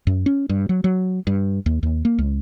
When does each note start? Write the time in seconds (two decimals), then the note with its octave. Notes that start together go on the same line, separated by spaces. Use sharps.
0.07 F#2
0.26 C#4
0.49 G2
0.69 F#3
0.84 F#3
1.27 G2
1.66 D#2
1.83 D#2
2.05 A#3
2.19 C#2